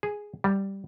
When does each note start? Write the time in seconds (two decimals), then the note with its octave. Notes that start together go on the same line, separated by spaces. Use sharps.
0.03 G#4
0.44 G3